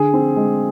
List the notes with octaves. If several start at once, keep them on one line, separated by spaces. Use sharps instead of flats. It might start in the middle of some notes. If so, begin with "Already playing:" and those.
Already playing: D3 G#4
C4
G#3